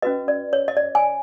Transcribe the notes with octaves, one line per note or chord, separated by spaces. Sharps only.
C#4 F#4 B4 D#5
D5
C#5
D#5
D5
G#5